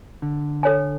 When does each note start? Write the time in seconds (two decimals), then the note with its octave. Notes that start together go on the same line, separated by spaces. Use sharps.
0.22 D3
0.63 A4 C#5 G#5